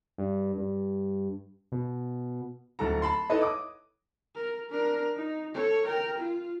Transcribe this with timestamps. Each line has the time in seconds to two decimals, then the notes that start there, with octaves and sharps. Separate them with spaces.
0.18 G2
0.58 G2
1.72 B2
2.79 D1 A4 A#5
3.02 A5 B5 C6
3.30 D#4 E4 A4 B4 C#5 D#5
3.42 D6 D#6
4.35 A#4
4.70 D4 A#4
5.16 D#4
5.54 A4 C#5
5.86 A#4 G5
6.18 F4